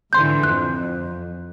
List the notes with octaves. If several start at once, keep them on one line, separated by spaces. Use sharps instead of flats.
G#2 D3 E3 C6 G6
F2 F#6